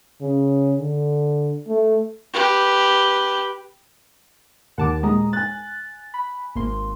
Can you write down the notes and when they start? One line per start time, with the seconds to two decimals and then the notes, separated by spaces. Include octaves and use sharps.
0.21 C#3
0.79 D3
1.68 A3
2.33 G4 B4
4.78 D#2 F#5 A5 D6
5.03 A#2 G#3 A#5 D#6
5.33 G#5 F#6 A6
6.14 B5
6.55 G#1 A#3 C6